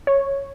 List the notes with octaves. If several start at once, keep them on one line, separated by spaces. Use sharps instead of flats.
C#5